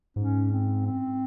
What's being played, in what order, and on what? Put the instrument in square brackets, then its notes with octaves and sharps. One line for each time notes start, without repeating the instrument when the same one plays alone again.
[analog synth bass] G#2 [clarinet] C#4
[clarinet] C4
C4